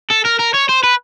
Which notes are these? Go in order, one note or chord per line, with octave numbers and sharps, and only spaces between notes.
A4
A#4
A#4
C#5
C5
B4